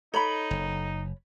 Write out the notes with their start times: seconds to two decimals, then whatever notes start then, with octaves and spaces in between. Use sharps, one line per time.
0.14 D#4 A4 C#5 A#5 B5 F#7
0.51 F#1